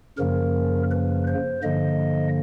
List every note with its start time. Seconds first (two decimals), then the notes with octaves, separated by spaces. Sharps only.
0.18 F#2 C#3 F3 A#3 A#4
0.91 B4
1.27 C5
1.63 G2 D3 F3 A#3 D#5